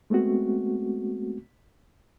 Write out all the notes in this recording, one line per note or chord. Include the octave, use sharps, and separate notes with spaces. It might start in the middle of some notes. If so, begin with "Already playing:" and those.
G#3 A3 B3 C4 F#4